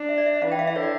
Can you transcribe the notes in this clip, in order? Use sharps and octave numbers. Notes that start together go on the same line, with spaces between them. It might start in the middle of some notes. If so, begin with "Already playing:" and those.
Already playing: D4
E5
D5
E5
E3 F5
G5
F5
E5
D3 C#5
D5